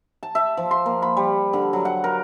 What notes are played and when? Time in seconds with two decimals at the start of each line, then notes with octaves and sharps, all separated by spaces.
0.23 A5
0.35 E5
0.57 F3
0.71 C6
0.86 A#3
1.02 B5
1.17 G3
1.53 D3
1.73 F#3
1.85 F#5
2.04 A#4